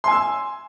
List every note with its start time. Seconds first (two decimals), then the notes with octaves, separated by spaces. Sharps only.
0.04 C6
0.08 G#5
0.11 E6